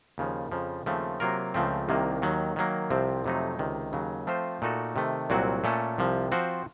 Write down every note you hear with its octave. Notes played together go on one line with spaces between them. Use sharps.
D#2 C#3 F3
F2 C#3 F3
D#2 C#3 F3 A3 C4
C3 F#3 A#3 F4 A#4
C#2 C#3 F3 A3 C4
C2 C3 D#3 A#3
D#2 D#3 F#3
D#3 F#3 A#3
C2 C3 F3 C4
F2 C3 F#3 A3 D#4
C#2 C3 D#3
D#2 C#3 F#3
F3 A3 C4 F4 C5
A#2 A3 D#4 F#4 A4
C3 D#3 A3
C2 A#2 F#3 C4 F#4
A#2 A3 C#4 A4
C2 C3 F3
F3 C4 F#4 C5